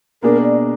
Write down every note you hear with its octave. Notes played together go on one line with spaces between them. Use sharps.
B2 A#3 D4 G#4 A#4
D5